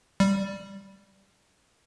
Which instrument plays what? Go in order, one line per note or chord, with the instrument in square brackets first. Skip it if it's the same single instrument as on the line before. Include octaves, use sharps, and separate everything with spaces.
[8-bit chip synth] G3